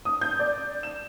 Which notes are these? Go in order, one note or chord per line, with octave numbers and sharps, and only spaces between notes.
D#6
G6
D5
E7